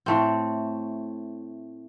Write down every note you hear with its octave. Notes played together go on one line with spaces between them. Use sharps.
A2 A3 C4